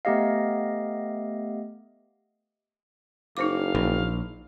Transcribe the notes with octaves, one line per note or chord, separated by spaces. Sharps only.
A3 B3 G4 D#5 F5
F#1 D#4 C5 F5 D6
A#1